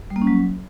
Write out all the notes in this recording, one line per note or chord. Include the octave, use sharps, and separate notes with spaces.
G3
A#3
C#4
F#3